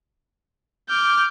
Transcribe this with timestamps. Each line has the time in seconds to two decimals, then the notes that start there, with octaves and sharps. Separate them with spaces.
0.89 D6 F6 G6